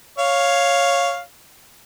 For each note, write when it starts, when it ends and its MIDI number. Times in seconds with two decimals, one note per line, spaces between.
0.19 1.20 73
0.19 1.20 77